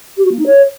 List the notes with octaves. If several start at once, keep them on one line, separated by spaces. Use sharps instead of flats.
G4
F#4
A#3
D#4
C#5